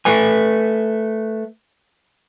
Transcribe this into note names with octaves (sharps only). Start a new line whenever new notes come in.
A3 B4 G#5